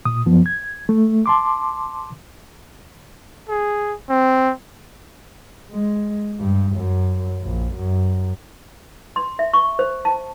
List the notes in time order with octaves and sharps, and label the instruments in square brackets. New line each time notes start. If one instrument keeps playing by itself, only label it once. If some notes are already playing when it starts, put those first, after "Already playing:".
[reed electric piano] A#2 D#6
F#2 F3 B3
G#6
A3
A5 C6 D6
[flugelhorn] G#4
C4
[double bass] G#3
G2
F#2
A#1
F#2
[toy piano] C6
E5
C#6
C5
A5